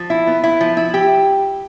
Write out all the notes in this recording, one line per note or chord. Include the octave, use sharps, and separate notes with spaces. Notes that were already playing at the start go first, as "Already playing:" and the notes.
Already playing: F3
E4
B3
E4
F3
E4
G4